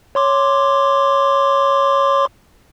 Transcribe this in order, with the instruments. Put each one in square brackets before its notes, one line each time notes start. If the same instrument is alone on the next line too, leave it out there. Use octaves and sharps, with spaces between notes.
[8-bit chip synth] C#5 C6 D6